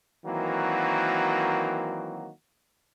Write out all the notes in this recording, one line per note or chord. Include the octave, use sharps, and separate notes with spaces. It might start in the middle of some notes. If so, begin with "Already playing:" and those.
D#3 E3 F#3 A#3 C4 F#4